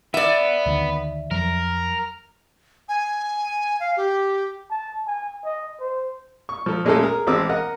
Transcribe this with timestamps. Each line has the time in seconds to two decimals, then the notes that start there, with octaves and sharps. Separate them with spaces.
0.14 B3 D5 E5
0.66 D2 D3 D#3
1.31 F2 F3 F#3 A#4
2.89 G#5
3.80 F5
3.97 G4
4.70 A5
5.07 G#5
5.44 D#5
5.80 C5
6.49 C#6
6.66 F3 A4
6.85 A#2 G#3 A3 C#4 G#4 A4
6.99 G#4 A#4
7.27 A1 G#3 C4 D6 E6
7.49 A#4 D#5 F#5